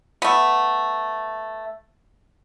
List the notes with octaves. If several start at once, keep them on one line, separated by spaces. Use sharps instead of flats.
A3 B3